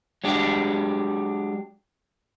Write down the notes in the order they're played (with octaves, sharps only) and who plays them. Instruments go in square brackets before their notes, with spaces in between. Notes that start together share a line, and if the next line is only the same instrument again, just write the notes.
[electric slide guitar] F#3 G#3 D4 G4